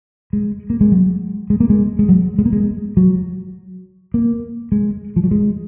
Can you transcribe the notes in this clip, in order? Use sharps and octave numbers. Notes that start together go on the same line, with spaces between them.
G#3
A#3
G#3
F#3
G#3
A#3
G#3
G#3
F#3
G#3
A#3
G#3
F#3
A#3
G#3
F3
F#3
G#3